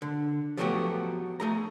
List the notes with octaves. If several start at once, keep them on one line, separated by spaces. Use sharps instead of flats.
D3
F3 F#3 A3 B3 F#4 G4
A3 G#4 A#5